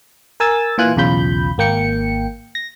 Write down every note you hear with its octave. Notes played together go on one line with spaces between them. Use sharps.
A#4 G#5 E6 A6
A#2 E3 F4 G#5 F#6
B1 E2 C#3 F4 B5 G6
G#1 A#3 G5 C#7
A#6